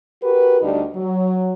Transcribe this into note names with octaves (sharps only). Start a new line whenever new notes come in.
F#4 G4 A#4 B4
D2 G3 D4 D#4 G4
F#3